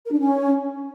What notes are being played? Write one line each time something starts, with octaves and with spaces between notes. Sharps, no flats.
A#4
D4
C#4